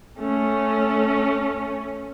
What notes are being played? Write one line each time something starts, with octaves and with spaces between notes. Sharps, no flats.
A3 C#4